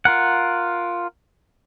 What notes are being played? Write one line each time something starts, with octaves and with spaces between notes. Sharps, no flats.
F4 A#4 F#5